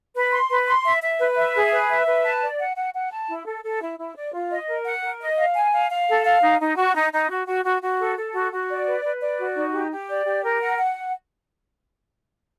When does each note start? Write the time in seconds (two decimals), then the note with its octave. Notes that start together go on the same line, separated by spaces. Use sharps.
0.15 B4
0.32 C6
0.50 B4
0.67 C6
0.85 E5
1.02 E5
1.20 B4
1.37 E5
1.55 G#4
1.72 B4
1.90 E5
2.07 B4
2.25 A5
2.42 D5
2.59 F#5
2.76 F#5
2.94 F#5
3.11 A5
3.29 E4
3.46 A4
3.63 A4
3.81 E4
3.99 E4
4.16 D5
4.33 F4
4.51 D#5
4.68 A#4
4.85 F#5
5.03 A#4
5.21 D#5
5.38 F5
5.55 G#5
5.73 F5
5.91 F5
6.08 A4
6.25 F5
6.42 D#4
6.59 D#4
6.77 F#4
6.95 D#4
7.12 D#4
7.29 F#4
7.47 F#4
7.64 F#4
7.82 F#4
7.99 A4
8.17 A4
8.34 F#4
8.52 F#4
8.69 D5
8.86 B4
9.04 B4
9.21 D5
9.39 F#4
9.56 D#4
9.73 G4
9.91 G4
10.08 D5
10.26 G4
10.43 A#4
10.61 F#5
10.78 F#5